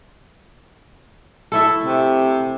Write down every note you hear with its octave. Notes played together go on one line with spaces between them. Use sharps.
A3 E4 A4
C3